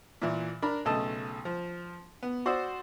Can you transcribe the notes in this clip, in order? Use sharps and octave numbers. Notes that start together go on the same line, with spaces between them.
A#2 E3
D4 A#4 B5
B1 C#3 A3 D#5 A5 E6
F3
B3
F#4 C5 D5 D#6 E6